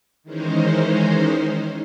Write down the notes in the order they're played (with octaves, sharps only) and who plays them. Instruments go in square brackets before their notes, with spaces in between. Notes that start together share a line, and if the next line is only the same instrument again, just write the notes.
[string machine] D#3 E3 G#3 C#4 D#4 C5